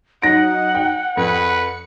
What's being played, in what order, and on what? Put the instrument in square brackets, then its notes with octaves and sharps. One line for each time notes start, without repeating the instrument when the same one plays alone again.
[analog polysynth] F#3 D#4 [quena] F#5 [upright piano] A#6 D7
[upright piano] G5
[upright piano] F2 [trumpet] B4 [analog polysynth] C#7